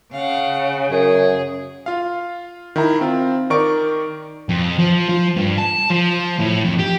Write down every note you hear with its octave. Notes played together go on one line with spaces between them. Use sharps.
C#3 F5 F#5
F#2 G#4
F4 F5
D#3 E4 A#5
C4 F4
D#3 A#4 D5 C#6 D7
F2
F3
F3
G2
A5
F3
A2
F2
G4